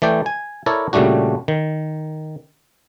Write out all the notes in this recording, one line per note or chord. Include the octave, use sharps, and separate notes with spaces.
E3 A3 D5 G5
G#5
E4 A4 A#4 C#5 D5
A#2 C#3 G3 A3 D4 F#4
D#3